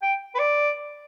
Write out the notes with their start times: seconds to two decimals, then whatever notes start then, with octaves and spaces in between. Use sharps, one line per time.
0.02 G5
0.35 B4
0.39 D5